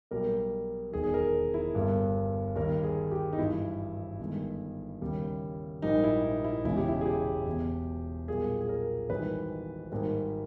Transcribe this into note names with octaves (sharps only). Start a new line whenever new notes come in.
B1 B2 G3 A#3 A#4
E1 D#2 D#3 G#4
G#4
A#4
E4
G1 G2 G3 A#3
D#2 D#3 G3 A#3 A#4
G#4
G4
D#4
G#1 G2 E3 E4
G1 G2 D#3 G#3
D#2 C#3 G3 A#3
A#1 G#2 G3 A#3 D#4
E4
D#4
E4
E1 E2 C#3 G#3 E4
G4
E4
G#4
G4
E1 E2 B2
B1 A#2 G3 A#3 G#4
G#4
A#4
G#1 G#2 E3 G3 A#3 B4
G#1 G#2 G3 A#3